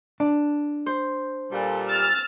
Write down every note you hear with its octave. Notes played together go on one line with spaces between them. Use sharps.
D4
C5
A#2 G3 A4
E6 F6 A6